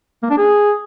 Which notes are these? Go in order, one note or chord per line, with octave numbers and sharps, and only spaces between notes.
A#3
D4
G#4